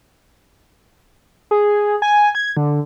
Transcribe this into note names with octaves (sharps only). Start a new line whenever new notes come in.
G#4
G#5
G#6
D3